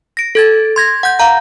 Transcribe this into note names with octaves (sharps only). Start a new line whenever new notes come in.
A#6 D7
A4 G#6 A6
C6 G#6 A#6
F#5 G6
F5 A#5 G6